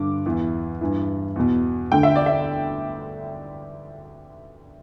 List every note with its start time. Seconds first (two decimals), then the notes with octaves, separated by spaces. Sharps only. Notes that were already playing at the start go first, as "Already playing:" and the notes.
Already playing: G2 D3 D6
0.26 E2 E3
0.81 G2 E3
1.36 E2 B2
1.92 D2 D3 G5
2.03 E5
2.15 D5
2.26 E5